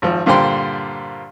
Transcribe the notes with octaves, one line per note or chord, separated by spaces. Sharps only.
G#1 F3
G2 A#2 D3 C5 G5 C6